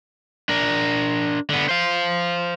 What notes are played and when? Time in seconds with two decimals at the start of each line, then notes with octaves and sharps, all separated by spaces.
0.49 D4 A#4
1.50 D3 B3
1.69 C5 F5